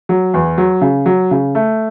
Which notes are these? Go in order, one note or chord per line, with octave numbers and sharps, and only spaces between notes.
F#3
E2
F#3
C#3
F#3
C#3
A3